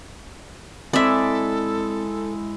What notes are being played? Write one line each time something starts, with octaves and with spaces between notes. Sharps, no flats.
G#3 C4 E4 A4 D5 E5